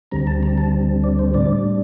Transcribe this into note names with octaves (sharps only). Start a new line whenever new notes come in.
D2 D3 G3 C4 A#5
A5
A#5
A5
D5
C5
A2 G3 D4 D5